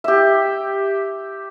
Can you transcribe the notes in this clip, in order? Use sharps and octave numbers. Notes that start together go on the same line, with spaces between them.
G4 E5